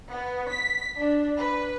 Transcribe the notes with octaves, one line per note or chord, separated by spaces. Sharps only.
B3
B6
D4
B4